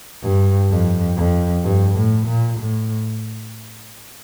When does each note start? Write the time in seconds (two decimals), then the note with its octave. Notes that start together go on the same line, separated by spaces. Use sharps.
0.22 G2
0.70 F2
1.16 F2
1.64 G2
1.95 A2
2.27 A#2
2.59 A2